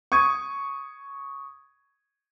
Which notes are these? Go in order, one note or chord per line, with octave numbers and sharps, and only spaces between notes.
C#6 D#6 G#6 D#7